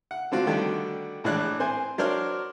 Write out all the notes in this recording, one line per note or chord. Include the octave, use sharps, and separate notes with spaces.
F#5
D3 A3 C4 F4 F#4
D3 D#3 G3 A3 F#4
A#1 A2 E3 G#3 D4 F#6
C4 C5 G#5
F#3 D4 A#4 C5 C#5 F6